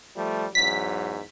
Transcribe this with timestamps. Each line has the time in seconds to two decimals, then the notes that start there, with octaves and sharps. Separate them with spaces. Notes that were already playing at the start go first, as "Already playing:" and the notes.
0.16 F3 G3 A3
0.55 E2 G#2 F#3 B6